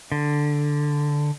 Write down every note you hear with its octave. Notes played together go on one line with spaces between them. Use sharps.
D3